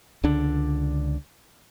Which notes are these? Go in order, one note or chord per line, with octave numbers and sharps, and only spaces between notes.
C#2 D3 D4